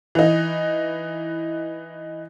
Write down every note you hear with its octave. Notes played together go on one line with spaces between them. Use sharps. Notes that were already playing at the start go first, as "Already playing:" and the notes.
E3 D#4